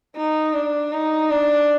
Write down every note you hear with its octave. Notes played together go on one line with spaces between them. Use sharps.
D#4
D4
D#4
D4